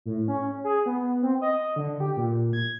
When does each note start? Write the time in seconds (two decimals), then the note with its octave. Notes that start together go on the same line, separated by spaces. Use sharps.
0.06 A2
0.28 C#4
0.64 G#4
0.86 B3
1.23 C4
1.41 D#5
1.76 D3
2.00 G4
2.17 A#2
2.53 G#6